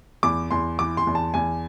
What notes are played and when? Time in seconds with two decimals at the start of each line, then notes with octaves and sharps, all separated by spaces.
0.23 E2 D6
0.51 E2 C6
0.79 E3 D6
0.97 C6
1.07 E2
1.15 A5
1.34 E2 G#5